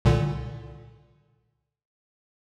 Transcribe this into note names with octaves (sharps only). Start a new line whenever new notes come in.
C2 A#2 D3